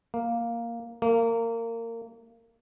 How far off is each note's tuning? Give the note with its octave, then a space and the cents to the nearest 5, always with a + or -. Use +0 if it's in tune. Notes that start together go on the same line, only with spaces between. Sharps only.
A#3 +0
A#3 -25